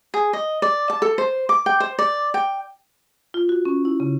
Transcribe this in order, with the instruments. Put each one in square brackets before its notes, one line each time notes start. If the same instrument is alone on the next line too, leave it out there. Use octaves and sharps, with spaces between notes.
[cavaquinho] G#4
D#5
D5
A5
A4
C5
D6
G5
C5
D5
G5
[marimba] F4
F#4
C#4
E4
C#3